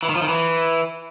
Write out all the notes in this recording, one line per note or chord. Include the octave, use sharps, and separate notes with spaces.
E3
D#3
F3
D#3
E3